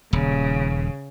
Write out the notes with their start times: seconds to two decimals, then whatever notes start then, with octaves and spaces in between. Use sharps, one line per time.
0.13 D#1 C#3